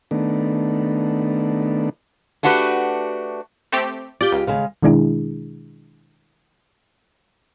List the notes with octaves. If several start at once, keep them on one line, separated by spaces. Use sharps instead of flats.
D#3 A3 B3 D4
A3 D4 F#4 G4 B4
A3 C4 G4
F4 G4 D5 G6
C#2
G#1 C#3 G#3 F5
B2 D#3 G#3 D4 E4 G#4